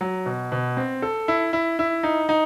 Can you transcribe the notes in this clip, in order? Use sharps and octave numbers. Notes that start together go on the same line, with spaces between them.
F#3
B2
B2
C4
A4
E4
E4
E4
D#4
D#4